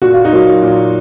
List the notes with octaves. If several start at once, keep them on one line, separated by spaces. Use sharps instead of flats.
A#2 F#4
F4
D#4 F#4
F#3 A#3
A#2